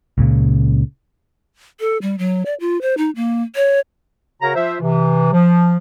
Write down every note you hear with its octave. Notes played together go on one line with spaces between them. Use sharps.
C#2 A#2 C#3
A4
G3
F#3
D5
F4
C5
D#4
A#3
C#5
C#3 F#4 A#4 C#5 A#5
F3 F4 C5 E5
C3 E3
F3